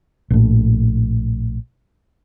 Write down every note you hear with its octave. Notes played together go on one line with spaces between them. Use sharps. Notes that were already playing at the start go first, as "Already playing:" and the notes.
A#1 A2